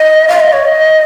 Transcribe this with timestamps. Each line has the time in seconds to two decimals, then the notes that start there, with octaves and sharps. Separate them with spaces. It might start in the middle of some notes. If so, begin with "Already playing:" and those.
Already playing: D#5
0.28 F5
0.40 D#5
0.52 C#5
0.64 D#5